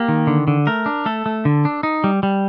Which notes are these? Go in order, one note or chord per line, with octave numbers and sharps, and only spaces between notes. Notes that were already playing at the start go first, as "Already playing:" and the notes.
Already playing: A#3 G4
D#3
D3
D3
A3 A#4
D4
A3 A4
A3
D3
D4
D#4
G3
G3